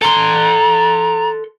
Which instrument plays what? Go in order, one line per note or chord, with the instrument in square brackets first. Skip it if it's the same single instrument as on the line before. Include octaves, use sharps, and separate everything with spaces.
[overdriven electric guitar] A4 C6 [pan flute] A#5